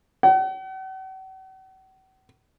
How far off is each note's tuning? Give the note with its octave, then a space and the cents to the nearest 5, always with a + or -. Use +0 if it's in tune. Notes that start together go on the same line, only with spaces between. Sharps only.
F#5 +45